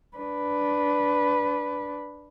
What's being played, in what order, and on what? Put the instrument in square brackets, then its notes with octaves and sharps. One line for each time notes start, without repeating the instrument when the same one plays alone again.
[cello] D4 B4